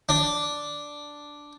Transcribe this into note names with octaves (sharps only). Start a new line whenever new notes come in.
D4